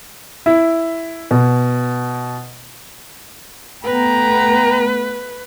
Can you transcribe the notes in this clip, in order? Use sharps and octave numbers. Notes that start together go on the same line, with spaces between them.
E4
B2
A3 B3 B4 G5 A#5